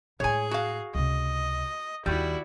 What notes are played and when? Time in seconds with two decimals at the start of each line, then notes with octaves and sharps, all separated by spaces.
0.20 A2 G#3 G#4 C#5 G#5
0.51 F#4 F5
0.95 C#2 C3 D#5
2.06 D#2 D#3 G3 E4 F#4